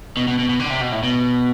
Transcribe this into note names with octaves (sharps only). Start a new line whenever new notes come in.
B2
B2
B2
B2
D3
C3
B2
A2
B2